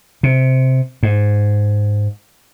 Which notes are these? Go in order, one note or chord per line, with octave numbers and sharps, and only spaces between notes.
C3
G#2